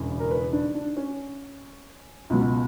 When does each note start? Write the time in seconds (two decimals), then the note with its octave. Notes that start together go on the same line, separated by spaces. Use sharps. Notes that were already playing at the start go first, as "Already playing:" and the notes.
Already playing: E1 E2 C#3
0.20 A#4
0.31 B4
0.53 D4
0.75 D4
0.97 C#4
2.30 C#2 B2 F#3